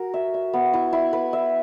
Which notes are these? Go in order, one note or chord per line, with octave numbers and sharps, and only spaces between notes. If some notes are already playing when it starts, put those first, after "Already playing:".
Already playing: F#4 A#4
E5
E5
B3
E4
E4
B4
E5